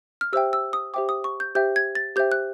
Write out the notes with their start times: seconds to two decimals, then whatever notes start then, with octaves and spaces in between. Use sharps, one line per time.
0.21 F6
0.33 G4 C5 E5 G5 E6
0.53 E6
0.73 D#6
0.94 G4 C5 E5 G5 D6
1.09 D#6
1.24 C#6
1.40 G6
1.55 G4 C5 E5 G5 G6
1.76 G#6
1.95 A6
2.16 G4 C5 E5 G5 G6
2.32 F#6